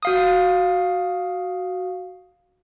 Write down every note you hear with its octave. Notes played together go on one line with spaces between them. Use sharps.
F#4 F5 D#6